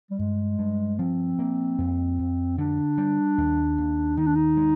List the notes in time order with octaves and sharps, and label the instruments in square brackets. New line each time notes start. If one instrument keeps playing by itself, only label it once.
[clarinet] G3
[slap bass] G2 [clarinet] G#3
[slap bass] G2
[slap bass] F3 [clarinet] C4
[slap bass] A#3
F2
F2
[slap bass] D3 [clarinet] D4
[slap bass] G3
D#2
D#2
[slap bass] D#3 [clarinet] D#4
[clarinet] D4
D#4
[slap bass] G#3